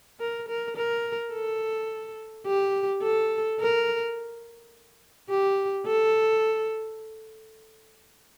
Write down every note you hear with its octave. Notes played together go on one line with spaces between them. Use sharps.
A#4
A#4
A#4
A4
G4
A4
A#4
G4
A4